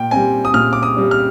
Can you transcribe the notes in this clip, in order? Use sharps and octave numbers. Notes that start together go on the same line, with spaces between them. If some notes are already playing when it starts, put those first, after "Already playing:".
Already playing: A#2 G5
G3 C4 G#5
D#6
A#2 F6
D6
D#6
G3 C4
F6